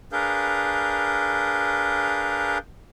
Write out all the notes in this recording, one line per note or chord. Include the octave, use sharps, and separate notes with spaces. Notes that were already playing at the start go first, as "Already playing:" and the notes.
D4 G#4 A#4 B4 F5 G6